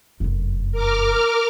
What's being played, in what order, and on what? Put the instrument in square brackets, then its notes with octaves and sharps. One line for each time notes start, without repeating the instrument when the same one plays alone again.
[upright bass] F1 F#2
[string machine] A#4 D6 F6